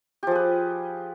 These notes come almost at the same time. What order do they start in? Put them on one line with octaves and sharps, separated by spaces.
G4 F3 G#4 B4